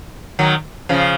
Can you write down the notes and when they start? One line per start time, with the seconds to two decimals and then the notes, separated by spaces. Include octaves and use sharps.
0.39 D#3 F#3
0.89 C#3 F3